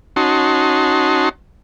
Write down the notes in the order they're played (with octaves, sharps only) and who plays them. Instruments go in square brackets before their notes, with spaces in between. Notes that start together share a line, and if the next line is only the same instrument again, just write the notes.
[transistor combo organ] C#4 D#4 F#4 A5 C6